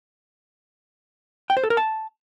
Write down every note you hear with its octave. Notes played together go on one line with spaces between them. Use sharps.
G5
C5
A4
A#4
A5